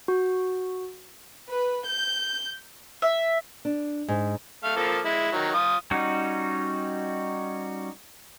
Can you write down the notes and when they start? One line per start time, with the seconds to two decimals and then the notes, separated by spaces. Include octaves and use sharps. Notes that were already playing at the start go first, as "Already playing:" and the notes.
0.08 F#4
1.52 B4
1.86 G6
3.02 E5
3.65 D4
4.08 G#2
4.64 A3 F5
4.76 F3 A#3 A4
5.05 G#3 E4
5.32 D#3 F#3
5.54 F4 D#6
5.91 G3 C#4 D#4 F#4